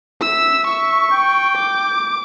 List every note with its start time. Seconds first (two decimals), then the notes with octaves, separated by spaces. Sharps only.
0.22 E5 E6
0.67 E5 C#6
1.11 G5
1.56 D6